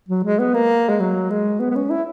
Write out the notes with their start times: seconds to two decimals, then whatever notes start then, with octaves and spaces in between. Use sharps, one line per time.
0.09 F#3
0.24 G#3
0.39 B3
0.54 A#3
0.89 G#3
1.00 F#3
1.30 G#3
1.60 B3
1.71 B3
1.75 C#4
1.90 E4